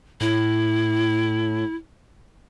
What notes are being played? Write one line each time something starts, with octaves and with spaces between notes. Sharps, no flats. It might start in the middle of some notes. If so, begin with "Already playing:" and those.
A2 E4